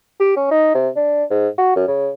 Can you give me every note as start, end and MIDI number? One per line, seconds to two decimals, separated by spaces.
0.20 0.35 67
0.36 0.48 61
0.51 0.70 63
0.74 0.89 48
0.96 1.24 62
1.30 1.48 44
1.58 1.73 66
1.76 1.86 42
1.88 2.10 49